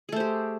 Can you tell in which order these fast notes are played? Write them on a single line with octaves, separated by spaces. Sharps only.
G#4 A3 C5 G4